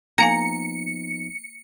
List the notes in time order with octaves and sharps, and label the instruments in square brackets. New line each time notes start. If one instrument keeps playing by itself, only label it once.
[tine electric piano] F3 B3 D#4 [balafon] A#3 F5 G#5 [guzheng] A#5 [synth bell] C#7